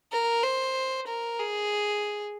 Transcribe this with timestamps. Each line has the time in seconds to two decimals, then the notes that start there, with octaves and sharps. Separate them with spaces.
0.12 A#4
0.43 C5
1.07 A#4
1.39 G#4